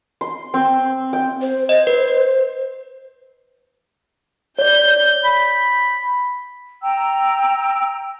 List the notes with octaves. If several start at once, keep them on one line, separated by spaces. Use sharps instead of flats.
C6
C4
G5
C5
C5 D#5
B4
C#5 D5 G6
B5
G5 A#5 E6